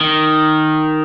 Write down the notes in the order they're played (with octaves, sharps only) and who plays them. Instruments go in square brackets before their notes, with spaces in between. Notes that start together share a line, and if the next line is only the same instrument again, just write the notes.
[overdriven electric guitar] D#3